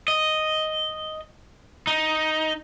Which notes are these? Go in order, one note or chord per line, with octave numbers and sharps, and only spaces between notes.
D#5
D#4